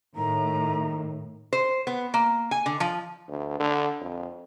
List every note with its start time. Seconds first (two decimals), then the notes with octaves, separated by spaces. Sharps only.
0.16 A2 D#3 A#5
1.53 C5
1.87 B3
2.14 A#3
2.51 G#5
2.66 D3
2.80 F3
3.28 D2
3.60 D3
4.01 F2